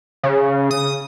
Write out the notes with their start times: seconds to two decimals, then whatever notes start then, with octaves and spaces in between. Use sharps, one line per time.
0.23 C#3
0.71 D#6